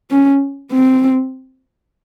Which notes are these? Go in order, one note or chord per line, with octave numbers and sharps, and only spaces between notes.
C#4
C4